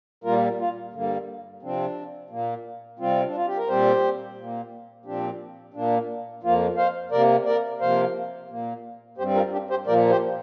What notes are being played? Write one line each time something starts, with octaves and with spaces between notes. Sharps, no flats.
A#2 G3 A#3 F4 A#4
F4
G2 D3 G3 A#3
C3 F3 C4 D4
A#2 A#3
C3 G3 C4 F4
D4
F4
G4
A#4
A#2 G3 C4 G4 C5
A#2 A#3
A#2 F3 C4 D4 G4
A#2 A#3 D4
F2 F3 A#3 F4
C5 F5
C3 A#3 A#4 D5
A#4 D5
C3 F3 A#3 C5 F5
A#2 A#3
G2 G3 C4 G4 C5
F4 A#4
D4 G4
G4 C5
A#2 F3 A#3 A#4 D5
G4 C5